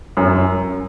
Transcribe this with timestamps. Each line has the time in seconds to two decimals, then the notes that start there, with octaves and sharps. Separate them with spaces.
0.17 F#2